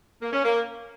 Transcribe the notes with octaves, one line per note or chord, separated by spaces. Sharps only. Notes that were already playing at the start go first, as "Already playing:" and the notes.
A#3
C#4
A#3